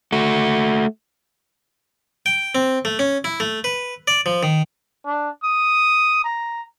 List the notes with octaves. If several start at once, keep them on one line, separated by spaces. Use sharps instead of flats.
A3 F#4
G5
C4
A3
C#4
E4
A3
B4
D5
F3
D#3
D4
D#6
A#5